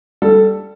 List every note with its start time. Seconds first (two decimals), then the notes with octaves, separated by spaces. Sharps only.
0.22 G3 A4